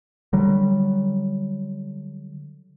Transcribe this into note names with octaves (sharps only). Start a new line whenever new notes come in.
D3 F#3 G3